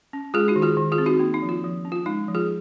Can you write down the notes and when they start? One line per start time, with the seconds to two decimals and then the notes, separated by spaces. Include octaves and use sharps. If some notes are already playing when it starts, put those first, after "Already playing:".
0.13 C#4
0.34 G#3 F4 G#4
0.48 D#4 F#4
0.56 D#3
0.62 F4 G#4
0.77 D#3
0.92 F4 G#4
0.98 C4
1.06 D#4 F#4
1.20 A#3 D#4
1.34 D#4
1.42 F3
1.49 F4
1.64 F3
1.85 C#4
1.92 F4
2.06 G#3 D#4
2.28 F3
2.35 F4 G#4